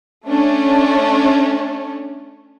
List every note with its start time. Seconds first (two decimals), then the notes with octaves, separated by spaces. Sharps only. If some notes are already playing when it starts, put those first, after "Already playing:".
0.28 A3 C#4 D4